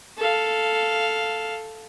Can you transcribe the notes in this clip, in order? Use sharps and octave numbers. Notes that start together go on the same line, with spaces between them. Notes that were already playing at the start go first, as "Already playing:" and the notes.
A4 F5